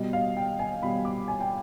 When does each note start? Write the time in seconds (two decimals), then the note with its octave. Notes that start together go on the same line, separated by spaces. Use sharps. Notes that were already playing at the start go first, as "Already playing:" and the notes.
Already playing: B2 G3 D#5
0.13 F5
0.37 G5
0.59 G#5
0.82 B2 G3 B5
1.05 D6
1.28 G#5
1.40 G5